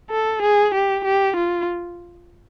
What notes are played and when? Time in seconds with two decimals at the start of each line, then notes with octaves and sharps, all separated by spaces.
0.11 A4
0.42 G#4
0.74 G4
1.05 G4
1.36 F4